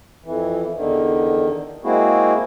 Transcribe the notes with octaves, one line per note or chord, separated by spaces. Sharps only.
F2 E3
E2 D3 D#3
G#3 A#3 C4 E4 F#4 G#4